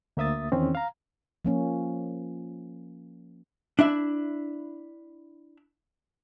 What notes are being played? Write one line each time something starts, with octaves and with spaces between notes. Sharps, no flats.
D2 A#3 E5 D#6 A6
E2 D#3 C4 C#4
F5 A#5
F3 A#3 C#4
D4 E4 E5